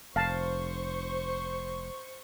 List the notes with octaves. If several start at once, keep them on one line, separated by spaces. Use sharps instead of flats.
F1 C5 F5 A5 C#6